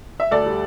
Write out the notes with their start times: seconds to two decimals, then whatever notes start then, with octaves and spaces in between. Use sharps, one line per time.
0.20 E5
0.31 D2 A4 D5
0.46 G3